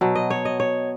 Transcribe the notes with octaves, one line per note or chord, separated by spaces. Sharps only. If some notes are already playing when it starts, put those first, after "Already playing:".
B2 F#3
D#5
C#5
D#5
C#5